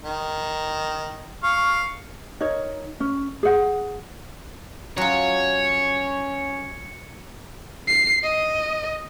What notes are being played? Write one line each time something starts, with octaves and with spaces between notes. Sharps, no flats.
D#3
F5 C#6
D#4 A#4 C#5
C#4
G#4 F#5
F#3 C#4 F4 C#5
C7
D#5